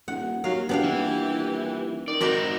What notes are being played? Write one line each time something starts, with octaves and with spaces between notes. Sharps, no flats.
D#1 F#5
D#2 F#3 F5
E1 B3 D4 G4 F5
D#1 E3
D#3 D5
C4 D#4 F#4 A#4 D5 B5